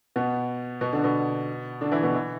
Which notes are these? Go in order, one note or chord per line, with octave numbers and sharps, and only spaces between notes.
B2 B3
B2 B3
D3 D4
B2 B3
D3 D4
E3 E4
B2 B3
E3